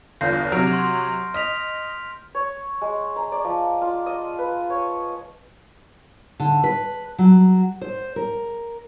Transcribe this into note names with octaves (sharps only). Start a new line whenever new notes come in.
G1 E2 F4 G6 A#6 C7
C3 F#3 F6 A#6 D7
C6
D#5 F6 B6 F7
C#5
G#3
A#5
D5
F3
F4
D#5
B4
C#5
D3
B4
F#3
C5
A#4